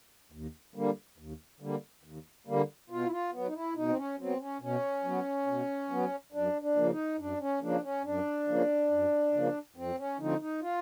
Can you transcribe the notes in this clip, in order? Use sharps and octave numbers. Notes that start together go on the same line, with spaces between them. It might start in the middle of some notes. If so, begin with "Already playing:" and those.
D#2
D3 G3 A#3
D#2
D3 G3 A#3
D#2
D3 G3 A#3
B2 F4
E4
F4
F#3 B3
D#4
E4
B2 D#4
C4
C#4
F#3 B3 C4
C#4
B2 C#4
F#3 B3
B2
F#3 B3
F#2 D4
D4
C#3 F3 A#3
D#4
F#2 D4
C#4
C#3 F3 A#3 D4
C#4
F#2 D4
C#3 F3 A#3
F#2
C#3 F3 A#3
F2 C4
C#4
D3 F3 A3 C4 D#4
D#4
F4